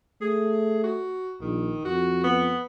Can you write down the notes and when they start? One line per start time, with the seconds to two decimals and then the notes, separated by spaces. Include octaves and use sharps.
0.22 A3 G#4
0.84 F#4
1.42 A#1 D#3
1.85 F2 F#4
2.24 B3